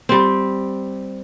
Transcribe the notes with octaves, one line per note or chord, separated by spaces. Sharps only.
G3 C4